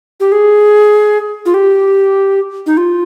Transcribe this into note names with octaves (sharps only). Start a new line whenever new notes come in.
G4
G#4
F4
G4
D#4
F4